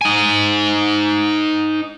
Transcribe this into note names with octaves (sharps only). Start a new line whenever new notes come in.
D#4 G#5